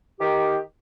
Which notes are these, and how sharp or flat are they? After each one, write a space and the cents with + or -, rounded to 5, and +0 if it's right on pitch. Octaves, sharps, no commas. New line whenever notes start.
D#3 +0 G4 +0